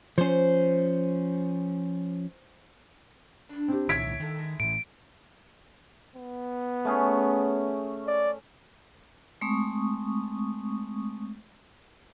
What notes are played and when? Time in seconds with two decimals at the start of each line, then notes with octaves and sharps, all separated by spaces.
0.18 F3 C#4 C5
3.49 G2 D4
3.68 C4 G4
3.89 C2 A#2 D#3 E4 C#5 G#6 B6 D7
4.20 G2 A#2 D#3 A4
4.38 G#3 E4
4.60 A2 E3 D7
6.16 B3
6.85 A3 C#4 G#4
8.08 D5
9.41 G#3 A3 C4 C#6 D#6